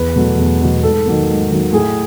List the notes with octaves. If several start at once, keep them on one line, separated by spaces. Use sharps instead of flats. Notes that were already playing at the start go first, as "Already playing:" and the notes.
Already playing: E2 B4
B2 F#3 A3
E2
B2 F#3 A3
G#2 A4
D#3 F#3 A#3
G#2
D#3 F#3 A#3
A2 G#4